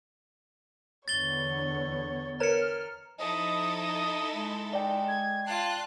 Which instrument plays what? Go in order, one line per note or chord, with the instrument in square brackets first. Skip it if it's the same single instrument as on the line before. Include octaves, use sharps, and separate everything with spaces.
[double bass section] E2 D3 B3 [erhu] C#5 [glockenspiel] A6 G7
[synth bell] A#4 B4 C#5 [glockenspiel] A#5 C#7 [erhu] F6
[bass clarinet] F3 [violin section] D#4 E4 A4 [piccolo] D#5
[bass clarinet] G#3
[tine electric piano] D5 G5
[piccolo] G#6
[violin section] F4 F#6 C7 [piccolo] A5